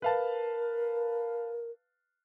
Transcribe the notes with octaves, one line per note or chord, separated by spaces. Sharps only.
A#4 B4 F5 A5